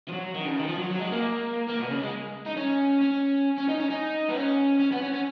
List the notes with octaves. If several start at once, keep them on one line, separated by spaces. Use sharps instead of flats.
F3
F#3
D#3
C#3
D#3
F3
F#3
F#3
G#3
A#3
A#3
B2
C#3
G#3
D#4
C#4
C#4
C#4
D#4
C#4
D#4
B3
C#4
C#4
B3
C#4
C#4